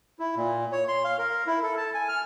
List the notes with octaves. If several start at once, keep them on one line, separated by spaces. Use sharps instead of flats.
E4
A#2
C#5
C6
F5
A#4
E4
A4
A5
G#5
F6